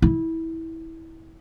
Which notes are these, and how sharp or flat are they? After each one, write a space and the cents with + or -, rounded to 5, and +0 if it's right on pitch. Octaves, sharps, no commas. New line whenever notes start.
E4 -20